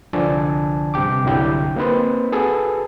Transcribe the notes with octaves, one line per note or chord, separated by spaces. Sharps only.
C2 D3 F3 D4 G#5 A5
G2 C3 G4 G5 D6
C2 D3 F#3 E4 G4 G6
A#3 C4 D#4 B4 C5
F#4 G#4 A4 B4